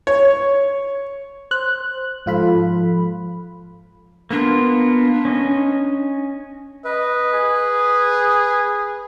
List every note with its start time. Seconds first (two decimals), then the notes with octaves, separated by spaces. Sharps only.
0.07 C#5
1.51 C5 F#6
2.26 G#2 F3 F4 A4 B5
4.31 A#3 B3 D4 F4
5.25 C#4 D#5
6.85 B4 D#5
7.33 G#4